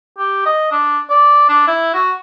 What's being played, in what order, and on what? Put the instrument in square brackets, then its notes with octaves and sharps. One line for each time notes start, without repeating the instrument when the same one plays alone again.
[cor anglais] G4
D#5
D4
D5
D4
E4
F#4